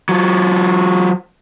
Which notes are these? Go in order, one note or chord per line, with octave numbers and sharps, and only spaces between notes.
F#3 F4